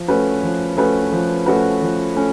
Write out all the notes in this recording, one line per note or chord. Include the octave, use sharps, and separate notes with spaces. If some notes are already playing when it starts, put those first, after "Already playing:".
Already playing: F3
A3 C#4 F#4 B4
F3
A3 C#4 F#4 B4
F3
A3 C#4 F#4 B4
F3
A3 C#4